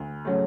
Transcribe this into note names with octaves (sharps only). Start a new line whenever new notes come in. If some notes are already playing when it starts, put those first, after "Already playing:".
Already playing: D2
C#3 F#3 A3